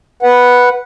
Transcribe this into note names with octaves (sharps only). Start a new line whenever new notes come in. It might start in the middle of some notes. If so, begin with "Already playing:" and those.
B4 F#5